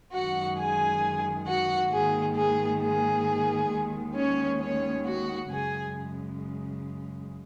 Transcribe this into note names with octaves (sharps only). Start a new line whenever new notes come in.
F#2 D#3 G#3 F#4 F#5
G#4 G#5
F#4 F#5
G#2 D#3 A#3 G#4
G#4
G#4
D#2 D#3 G#3
C#4 C#5
C#4 C#5
F#4 F#5
F#2 C#3 G#3 G#4 G#5